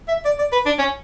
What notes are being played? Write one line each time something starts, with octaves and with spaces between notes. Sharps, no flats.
E5
D5
D5
B4
D4
C#4